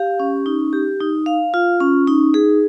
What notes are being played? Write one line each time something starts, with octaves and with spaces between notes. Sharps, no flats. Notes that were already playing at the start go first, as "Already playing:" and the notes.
Already playing: G4 F5
C#4
D#4
G4
D#4
F5
F4
C#4
D#4
G#4